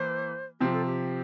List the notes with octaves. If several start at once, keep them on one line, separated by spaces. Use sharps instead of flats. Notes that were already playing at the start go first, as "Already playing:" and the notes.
Already playing: E3 A#3 C5
C3 F3 C4 G4
A4
G4